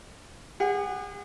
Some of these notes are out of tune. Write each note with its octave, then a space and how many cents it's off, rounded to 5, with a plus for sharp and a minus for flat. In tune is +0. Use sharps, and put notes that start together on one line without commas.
G#4 -45 F#5 +5